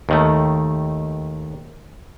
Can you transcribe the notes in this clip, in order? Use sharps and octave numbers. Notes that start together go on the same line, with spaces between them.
D#2 D#3 A3